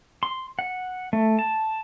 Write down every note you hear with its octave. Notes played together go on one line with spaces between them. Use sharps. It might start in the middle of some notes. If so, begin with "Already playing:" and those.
C6
F#5
A3
A5